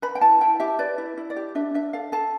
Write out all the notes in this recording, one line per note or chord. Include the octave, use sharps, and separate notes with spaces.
B4 B5
G5
E4 A5
E4 G5
G4 E5
B4 D5
E4
E4
D5
G4
D4 E5
D4 E5
A4 F5
A4 A5